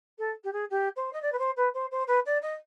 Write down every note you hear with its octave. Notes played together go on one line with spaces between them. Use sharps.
A4
G4
G#4
G4
C5
D#5
D5
B4
C5
B4
C5
C5
B4
D5
D#5